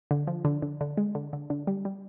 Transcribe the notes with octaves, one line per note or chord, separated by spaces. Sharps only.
D3
F3
D3
D3
D3
G#3
D3
D3
D3
G3
G3